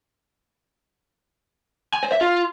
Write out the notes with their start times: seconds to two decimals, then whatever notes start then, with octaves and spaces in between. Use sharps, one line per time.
1.94 G#5
2.03 C5
2.12 E5
2.21 F4